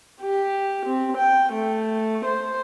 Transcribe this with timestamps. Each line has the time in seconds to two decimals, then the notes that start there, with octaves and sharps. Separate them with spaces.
0.21 G4
0.86 C4
1.18 G5
1.53 A3
2.26 C5